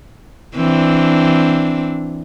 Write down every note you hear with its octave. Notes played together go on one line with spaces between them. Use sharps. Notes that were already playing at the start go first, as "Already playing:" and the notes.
E3 C4 D4